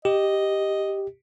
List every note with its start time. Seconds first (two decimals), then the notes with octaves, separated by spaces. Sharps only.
0.05 G4 D#5